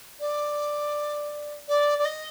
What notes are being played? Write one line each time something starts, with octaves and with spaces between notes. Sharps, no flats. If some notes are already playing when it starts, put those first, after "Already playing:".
D5
D5
D5
D#5